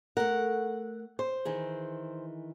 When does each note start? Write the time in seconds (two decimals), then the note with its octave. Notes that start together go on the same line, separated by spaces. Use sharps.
0.17 A3 A#4 F#5
1.19 C5
1.45 D#3 E3 G#4